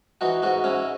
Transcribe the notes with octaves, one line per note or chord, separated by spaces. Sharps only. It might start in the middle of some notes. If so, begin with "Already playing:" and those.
E3 D#4 F#4
G#2 D#4 F#4
G#2 C#4 E4